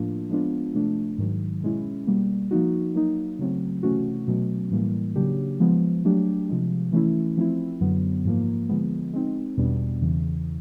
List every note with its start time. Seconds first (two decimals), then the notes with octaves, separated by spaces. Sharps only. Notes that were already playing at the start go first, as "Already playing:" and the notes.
Already playing: A2 F3 A#3 D4 F4
0.30 F3 G#3 B3 D4 F4
0.74 C3 F3 A3 D4
1.18 G#2 D#3 F#3
1.63 B2 G#3 C#4 E4
2.07 B2 G3 A#3
2.51 F3 A#3 D#4 F#4
2.95 F#3 A#3 D#4
3.39 C#3 F#3 A3 C4
3.83 C3 E3 A3 C#4 F#4
4.28 B2 F#3 A3 C#4
4.71 A2 E3 G3 A#3
5.16 C#3 F#3 A#3 D4 G4
5.60 F3 G#3 B3
6.05 F#3 A3 D4 G4
6.49 C3 F3 G#3
6.92 E3 A3 C#4 E4
7.37 F3 A3 C4 E4
7.81 F#2 D3 F#3 B3
8.25 G#2 F3 A#3
8.69 D3 F3 G#3 B3
9.13 G#3 C4 D#4
9.57 E2 B2 G3 B3 D4
10.01 E2 C#3 E3